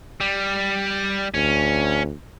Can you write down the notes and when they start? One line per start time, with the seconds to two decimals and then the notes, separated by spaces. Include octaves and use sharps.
0.21 G3
1.34 D2 C#4